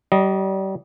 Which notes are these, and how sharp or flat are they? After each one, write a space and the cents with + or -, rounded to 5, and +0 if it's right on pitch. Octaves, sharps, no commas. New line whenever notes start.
G3 -35 D#5 +0